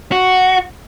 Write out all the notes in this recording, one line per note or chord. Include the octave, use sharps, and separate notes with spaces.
F#4